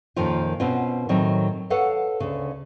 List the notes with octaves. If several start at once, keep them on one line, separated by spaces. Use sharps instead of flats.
F2 A#2 D#3 F3 C#4 F4
B2 C4 C#4 F4
A2 D#3 F#3 C4
A4 B4 C#5 F5 F#5
D2 C#3